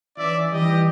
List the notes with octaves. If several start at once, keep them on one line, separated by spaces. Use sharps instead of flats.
E3 C#4 D5 E5
E3 G3 G4 D#5